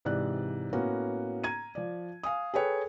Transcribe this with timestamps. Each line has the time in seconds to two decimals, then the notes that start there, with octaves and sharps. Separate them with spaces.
0.05 G#2 C3 E3 D5 F#6
0.73 A2 A#3 B3 C#4 F#4
1.44 A#5 G#6 D#7
1.75 F3 D5
2.24 F5 G#5 D#6
2.54 G#4 A4 B4 C#5 G5